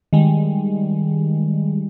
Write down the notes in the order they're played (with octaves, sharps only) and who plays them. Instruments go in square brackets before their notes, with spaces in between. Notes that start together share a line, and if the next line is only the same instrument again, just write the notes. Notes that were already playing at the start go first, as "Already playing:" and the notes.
[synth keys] D#3 G3 G#3